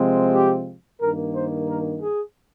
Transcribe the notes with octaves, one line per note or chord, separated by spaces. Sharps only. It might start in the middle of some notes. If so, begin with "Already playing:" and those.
Already playing: C3 F3 G#3 C4
G4
G2 D#3 A#3 A#4
C5
A#4
G#4